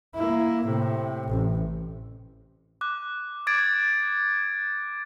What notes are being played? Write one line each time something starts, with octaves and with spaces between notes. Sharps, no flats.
A#3 E4
A2 C3
A1
D6 F#6
D6 G#6 A6 D7